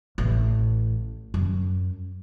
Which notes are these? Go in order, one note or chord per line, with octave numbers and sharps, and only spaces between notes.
A1
F#2